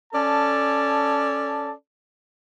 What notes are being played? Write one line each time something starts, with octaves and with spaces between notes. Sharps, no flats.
C#4 A4 D5 A5